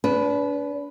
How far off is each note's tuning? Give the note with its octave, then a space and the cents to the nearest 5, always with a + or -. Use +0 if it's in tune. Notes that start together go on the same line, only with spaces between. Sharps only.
D4 -40 B4 +0